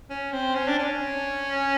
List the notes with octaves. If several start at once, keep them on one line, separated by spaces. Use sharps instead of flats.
C#4
C4
C#4
D4
C#4